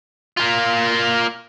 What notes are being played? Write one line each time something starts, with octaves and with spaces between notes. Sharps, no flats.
A#3 F4